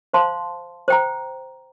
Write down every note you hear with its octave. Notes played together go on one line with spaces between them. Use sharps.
C5 F5 A5 C6
C5 G5 A#5